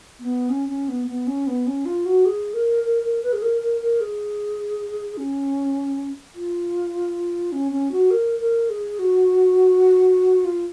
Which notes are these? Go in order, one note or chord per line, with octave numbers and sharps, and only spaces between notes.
B3
C#4
C#4
B3
B3
C#4
B3
C#4
F4
F#4
G#4
A#4
A#4
A#4
B4
G#4
A#4
A#4
A#4
G#4
C#4
F4
C#4
C#4
F#4
A#4
A#4
G#4
F#4
F4